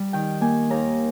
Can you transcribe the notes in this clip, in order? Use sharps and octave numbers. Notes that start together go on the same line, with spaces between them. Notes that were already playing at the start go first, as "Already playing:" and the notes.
Already playing: G3
D#3 G5
A#3 G#5
D#2 A#5